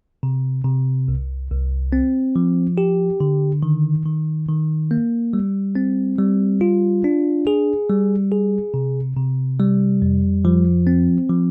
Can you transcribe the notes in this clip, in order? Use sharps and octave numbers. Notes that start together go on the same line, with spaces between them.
C3
C3
C2
C2
C4
F3
G4
D3
D#3
D#3
D#3
A#3
G3
C4
G3
F4
D4
G#4
G3
G#4
C3
C3
G3
F2
F3
C4
F3